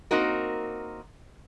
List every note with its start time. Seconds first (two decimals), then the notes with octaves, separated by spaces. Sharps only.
0.11 A#3 C4 D#4 F#4 A#4